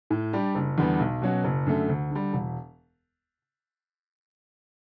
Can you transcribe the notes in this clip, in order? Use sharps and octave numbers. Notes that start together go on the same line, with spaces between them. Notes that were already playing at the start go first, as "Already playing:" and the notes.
A2
G3 D4 G4 D5
F#1
E2 D3 G3 B3
B1
B2 F#3 C#4 F#4
F#1
F#2 D3 A3
D2
D3 G3
E1